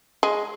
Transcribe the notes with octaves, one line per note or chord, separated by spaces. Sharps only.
G#3